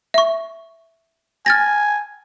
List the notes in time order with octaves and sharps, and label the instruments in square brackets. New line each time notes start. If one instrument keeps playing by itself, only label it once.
[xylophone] E5 C#6
[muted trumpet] G#5 [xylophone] F6 A6 A#6